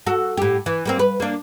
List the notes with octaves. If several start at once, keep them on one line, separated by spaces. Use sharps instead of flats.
F#4 A4
A2 G4
E3
G3 A#3 C4
B4
A#3 D4